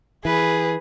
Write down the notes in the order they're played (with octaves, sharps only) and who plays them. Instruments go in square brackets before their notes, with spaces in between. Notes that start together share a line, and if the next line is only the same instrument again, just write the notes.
[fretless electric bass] E3 [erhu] G#4 [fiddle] B4